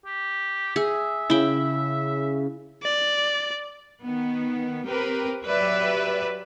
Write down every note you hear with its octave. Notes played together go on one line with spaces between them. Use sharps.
G4
G#4 E5
C#3 E4 G5
D5
D#3 B3
C4 G4 A#4 B4
F#3 G4 B4 D5 E5